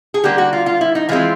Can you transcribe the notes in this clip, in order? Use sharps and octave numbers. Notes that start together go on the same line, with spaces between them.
G#4
D3 G3 A#3 G4
F#4
F4
F4
E4
D#4
E3 G#3 C4 F4